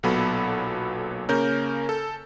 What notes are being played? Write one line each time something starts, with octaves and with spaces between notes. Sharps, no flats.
B1 A#2 F#3 B3 A4 B5
C#3 A#3 C#4 A#4 G6
A4